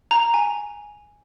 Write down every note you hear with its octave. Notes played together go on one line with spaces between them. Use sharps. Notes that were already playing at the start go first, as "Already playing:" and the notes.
A#5
G#5